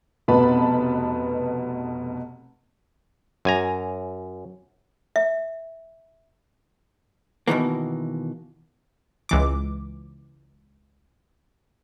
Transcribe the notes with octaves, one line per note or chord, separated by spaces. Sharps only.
F1 B2 B3 A5 B5
F#2 G#5 A#5
E5
B2 D#3 E3 A#3
C#2 E3 D6